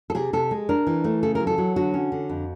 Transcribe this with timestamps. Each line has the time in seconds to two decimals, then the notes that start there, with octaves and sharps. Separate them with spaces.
0.10 A4
0.15 C3 G#4
0.33 C3 A4
0.51 G#3
0.69 D4 A#4
0.87 E3
1.04 A3
1.23 C#3 A4
1.35 A#4
1.40 F#3
1.47 A4
1.58 F#3
1.76 D3 F#4
1.94 C#4
2.12 D3
2.30 F2